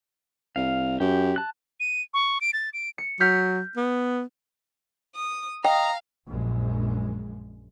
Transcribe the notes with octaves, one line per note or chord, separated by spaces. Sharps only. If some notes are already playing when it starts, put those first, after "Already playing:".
C2 F5
F#2 G4
A5 F#6
D#7
C#6
D7
A6
D7
C#7
F#3 F6 G6 B6
B3
D#6
D#5 F5 G5 A#5
A#1 F#2 G#3